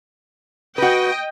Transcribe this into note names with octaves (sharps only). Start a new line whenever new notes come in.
F#4 B4 D#5 G5